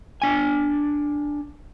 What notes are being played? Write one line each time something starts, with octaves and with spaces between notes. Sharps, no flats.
D4 G#5